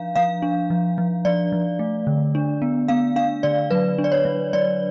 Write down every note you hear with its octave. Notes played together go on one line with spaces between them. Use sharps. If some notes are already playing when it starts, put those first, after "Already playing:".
Already playing: F3 D4 F5
F3 F5
D4
F3
F3
F3 D5
F3
A3
D3
D4
B3
B3 F5
D4 F5
D3 D5
F#3 B4
D4
D5
C#5
F#3
F#3 D5